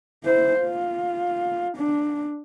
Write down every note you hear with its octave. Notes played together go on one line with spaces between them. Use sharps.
E4 C5
F4
D4